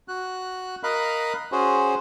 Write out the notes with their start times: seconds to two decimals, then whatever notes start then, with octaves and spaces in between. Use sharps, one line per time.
0.08 F#4 F#6
0.83 A#4 D#5 F5 B5 F#6
1.52 C#4 F#4 G#4 C5